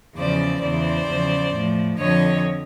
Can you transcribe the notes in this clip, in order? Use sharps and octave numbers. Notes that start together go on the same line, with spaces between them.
E2 C#3 F3 C5 D5
E2 C#3 E3 C5 D5
E2 C#3 F3
A2 F3
F2 D3 F3 C#5 D#5